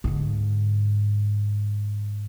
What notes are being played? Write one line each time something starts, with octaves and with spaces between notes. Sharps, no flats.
G#2 D3